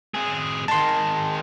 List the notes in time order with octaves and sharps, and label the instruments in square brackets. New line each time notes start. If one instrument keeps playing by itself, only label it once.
[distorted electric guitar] C4 G#4
[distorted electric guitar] D#3 G#3 [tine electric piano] A5 C6